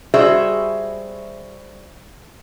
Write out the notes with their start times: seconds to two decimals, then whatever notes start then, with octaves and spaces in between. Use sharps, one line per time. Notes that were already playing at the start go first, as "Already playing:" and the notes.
0.14 G3 F#4 G#4 C5 E5